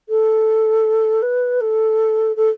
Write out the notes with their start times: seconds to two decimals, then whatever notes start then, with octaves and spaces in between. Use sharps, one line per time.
0.09 A4
1.22 B4
1.61 A4
2.36 A4